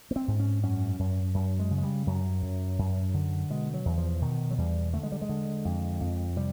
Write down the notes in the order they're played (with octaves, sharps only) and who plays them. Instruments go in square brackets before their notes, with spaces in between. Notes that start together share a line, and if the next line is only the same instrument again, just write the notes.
[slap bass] B3
C4
G#2
C#4
F#2 C#4
F#2
F#2
G#3
C#3
G#3
G3
F#2 F#3
F#2
F#2
D3
B2 G#3
F#3
E2
F3
B2 D#3
F#3
E2 G3
D3 A3
G#3
G3
G#3
D3
F2
F2
C3 G3